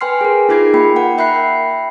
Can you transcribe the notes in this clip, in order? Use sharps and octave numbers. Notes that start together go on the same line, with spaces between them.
B4 G5 G#5 C6 F6 C7
G#4 A#4
D#4 F4 G#4 G#6 C7
A#3 F4 G5 B5
A#4 F#5 G5
E5 G5 B5 F#6 C7